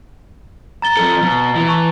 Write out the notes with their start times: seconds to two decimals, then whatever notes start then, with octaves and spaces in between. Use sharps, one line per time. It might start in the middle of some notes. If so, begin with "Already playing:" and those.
0.82 A#5 A6 G7
0.97 F3 A4
1.22 B2
1.55 E3
1.69 A5 C#6